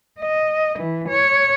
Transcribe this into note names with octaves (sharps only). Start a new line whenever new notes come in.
D#5
E3
C#5